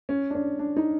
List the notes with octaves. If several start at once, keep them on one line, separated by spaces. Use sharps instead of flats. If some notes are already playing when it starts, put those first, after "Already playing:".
C#4
D4
C#4
D4
D#4